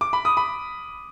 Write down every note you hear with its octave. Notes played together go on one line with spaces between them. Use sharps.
D6
B5
D#6
B5